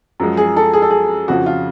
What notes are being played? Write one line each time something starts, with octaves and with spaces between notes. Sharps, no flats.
F#2 F3 G#3
G#4
A4
G#4
A4
G#4
F2 C#3 F3 F#4
F4